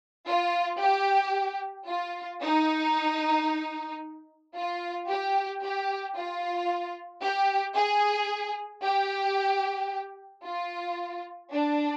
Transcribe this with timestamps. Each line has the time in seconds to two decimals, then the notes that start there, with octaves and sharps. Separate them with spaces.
0.28 F4
0.80 G4
1.88 F4
2.42 D#4
4.56 F4
5.10 G4
5.63 G4
6.16 F4
7.23 G4
7.76 G#4
8.83 G4
10.45 F4
11.51 D4